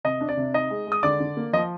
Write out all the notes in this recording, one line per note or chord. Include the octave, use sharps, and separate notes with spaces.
C3 D#5
D4
D5
C3
D#4 D#5
G#3
G#3
D#6
D3 D5 D6
D3
A#3
F3 D#5